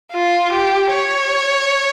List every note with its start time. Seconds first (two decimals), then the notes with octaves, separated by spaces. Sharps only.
0.12 F4
0.53 G4
0.93 C#5